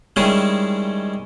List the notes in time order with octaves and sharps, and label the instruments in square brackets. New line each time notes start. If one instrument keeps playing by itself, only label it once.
[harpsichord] D#3 G3 G#3 C#4 E4 G#4